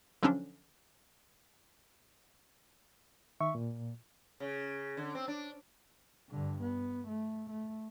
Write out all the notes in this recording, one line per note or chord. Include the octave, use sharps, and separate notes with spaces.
D3 F3 F#3 C#4 D4
D#3 E5 C#6
A#2
C#3
D3
C4
D4
G2 D3
B3
A3
A3